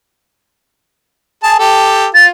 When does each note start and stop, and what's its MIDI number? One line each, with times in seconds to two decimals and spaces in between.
1.43 1.58 68
1.43 1.58 81
1.59 2.07 67
1.59 2.07 69
2.14 2.29 65
2.14 2.25 93